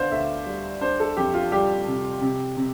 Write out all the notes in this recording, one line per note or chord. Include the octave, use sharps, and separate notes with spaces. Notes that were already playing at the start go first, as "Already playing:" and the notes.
Already playing: D3 B3 C5 D5 F5
D2 E5
G3
D4 C5
A4
F2 G4
F4
G3 G4
C3
C3
C3